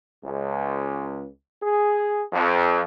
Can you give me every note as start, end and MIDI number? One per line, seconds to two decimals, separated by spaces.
0.24 1.26 37
1.63 2.21 68
2.33 2.82 41